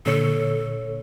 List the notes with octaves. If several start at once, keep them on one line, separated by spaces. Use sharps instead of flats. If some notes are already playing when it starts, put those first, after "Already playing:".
A#2 D3 A4 C#5